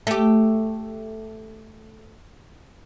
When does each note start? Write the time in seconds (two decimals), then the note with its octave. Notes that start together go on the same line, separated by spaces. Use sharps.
0.07 A3 G4